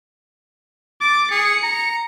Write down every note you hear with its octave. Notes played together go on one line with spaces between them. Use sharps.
D6 A6
G#4 C#7
A#5